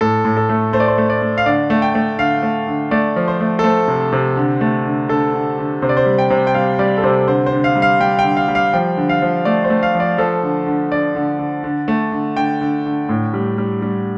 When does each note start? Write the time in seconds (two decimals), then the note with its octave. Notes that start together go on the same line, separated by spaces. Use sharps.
0.01 A2 A4
0.25 A2
0.37 A4
0.49 A3
0.73 A3 C5
0.80 D5
0.88 C5
0.98 A3
1.10 D5
1.22 A3
1.38 F5
1.46 D3 D5
1.70 A3
1.82 G5
1.95 A3
2.18 D3 F5
2.43 A3
2.67 D3
2.91 A3 D5
3.16 F3
3.28 C5
3.41 A3
3.59 A4
3.64 A3 C5
3.88 C3
4.13 C3
4.37 D3
4.61 A3
4.85 D3
5.09 D3 A4
5.34 D3
5.59 D3
5.82 C3 C5
5.89 D5
5.97 C5
6.06 G3
6.18 G5
6.30 C3
6.47 G5
6.54 G3 F5
6.79 G3 D5
6.98 A4
7.03 C3 C5
7.28 D3 C5
7.46 C5
7.52 D3
7.64 F5
7.76 G3
7.82 F5
8.00 G3 G5
8.19 G5
8.24 D3
8.37 F5
8.48 G3
8.55 F5
8.73 F3 G5
8.97 D3
9.09 F5
9.22 F3
9.45 A3 D5
9.64 C5
9.70 A3
9.83 F5
9.95 F3
10.00 D5
10.18 F3 A4
10.43 D3
10.67 D3
10.92 D3 D5
11.15 D3
11.39 D3
11.64 D3
11.88 A3
12.12 D3
12.36 D3 G5
12.61 D3
12.86 D3
13.09 A2
13.34 G3
13.58 G3
13.82 G3